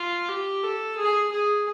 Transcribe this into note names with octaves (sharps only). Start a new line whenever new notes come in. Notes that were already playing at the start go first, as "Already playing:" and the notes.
Already playing: F4
G4
A4
G#4
G#4